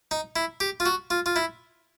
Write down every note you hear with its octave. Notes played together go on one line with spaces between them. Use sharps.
D#4
E4
G4
F4
F#4
F4
F4
E4